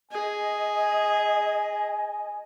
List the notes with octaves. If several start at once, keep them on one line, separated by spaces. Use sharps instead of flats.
G#4 D#5 G#5